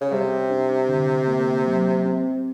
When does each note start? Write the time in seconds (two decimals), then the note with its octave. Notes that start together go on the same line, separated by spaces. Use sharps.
0.01 C#3
0.12 C3 G3
0.50 D4
0.89 D3
1.27 A#3
1.67 F#3
2.05 C4